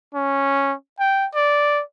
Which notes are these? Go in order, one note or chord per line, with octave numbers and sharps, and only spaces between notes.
C#4
G5
D5